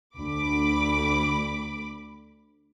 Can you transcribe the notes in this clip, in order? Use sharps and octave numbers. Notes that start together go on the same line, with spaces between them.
D2 B5 D6